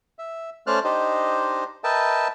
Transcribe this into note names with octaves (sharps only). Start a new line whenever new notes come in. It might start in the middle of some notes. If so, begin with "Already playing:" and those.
E5
A3 C#4 C5 D5 F6 F#6
D4 D#4 G4 C5 D#5
A#4 B4 D#5 E5 G5 A5